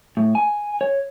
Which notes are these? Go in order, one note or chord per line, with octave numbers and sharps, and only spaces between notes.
A2
G#5
C#5